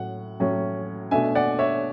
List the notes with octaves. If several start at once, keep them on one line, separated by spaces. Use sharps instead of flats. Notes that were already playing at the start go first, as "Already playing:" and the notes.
Already playing: A2 F#3 C#4 F#5
A2 F#3 C#4
B2 A3 D4 E5 G#5
D5 F#5
C#5 E5